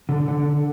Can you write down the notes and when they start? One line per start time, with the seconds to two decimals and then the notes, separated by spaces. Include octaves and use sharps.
0.09 D3 A4
0.28 D3
0.46 D3